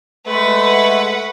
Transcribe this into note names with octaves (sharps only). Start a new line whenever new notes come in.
G#3 A3 B4 F#5